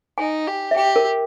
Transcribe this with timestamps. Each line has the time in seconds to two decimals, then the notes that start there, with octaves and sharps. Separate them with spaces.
0.18 D#4 G#5
0.47 G4
0.71 E5
0.76 G4 G5
0.96 A#4